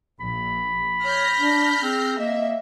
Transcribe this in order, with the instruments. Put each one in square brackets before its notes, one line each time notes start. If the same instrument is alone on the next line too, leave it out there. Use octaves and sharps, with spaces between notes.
[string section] A#1 [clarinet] B5
[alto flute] C#5 [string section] F6 G6 A#6
[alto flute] D4
[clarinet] C4 [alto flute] G#4
[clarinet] A#3 [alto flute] D#5 [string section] E5